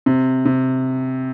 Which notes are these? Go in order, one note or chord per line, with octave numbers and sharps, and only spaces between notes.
C3
C3